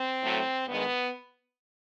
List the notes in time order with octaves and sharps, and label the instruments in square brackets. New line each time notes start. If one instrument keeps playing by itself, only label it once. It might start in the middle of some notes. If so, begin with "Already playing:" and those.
Already playing: [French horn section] C4
A2 F#3 A3
G2 D#3 G#3 B3